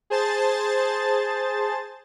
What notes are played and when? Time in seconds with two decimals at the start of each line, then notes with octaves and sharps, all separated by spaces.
0.10 G#4 C5 A5 A6